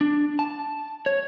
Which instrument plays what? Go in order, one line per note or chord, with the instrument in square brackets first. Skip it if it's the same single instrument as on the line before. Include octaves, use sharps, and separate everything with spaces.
[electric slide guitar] D4
A5
C#5